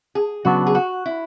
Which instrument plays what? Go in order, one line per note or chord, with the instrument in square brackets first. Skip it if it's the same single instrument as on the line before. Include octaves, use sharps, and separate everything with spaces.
[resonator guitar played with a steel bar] G#4
[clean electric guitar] C#3 F#3 B3 D4 [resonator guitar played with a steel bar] F#4
[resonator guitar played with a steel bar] G#4
F#4
E4